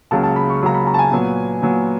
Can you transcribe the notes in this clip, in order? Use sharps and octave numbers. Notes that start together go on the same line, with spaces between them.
C#2 C#3 F#3 A#3 A5
A5
B5
C#6
C#2 C#3 F#3 A#3 A#5
B5
A#5
A5
G#5
A#2 F#3 B3
A#2 F#3 B3